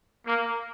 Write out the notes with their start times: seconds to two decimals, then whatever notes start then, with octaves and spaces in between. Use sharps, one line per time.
0.25 A#3